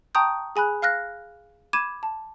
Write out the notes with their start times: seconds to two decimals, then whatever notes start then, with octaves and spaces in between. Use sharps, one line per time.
0.15 G5 A5 A#5 C#6 D#6 G6
0.56 G#4 G#5 B5 F#6
0.82 F5 F6 F#6 A#6
1.73 B5 D6 G#6 D#7 E7
2.03 A5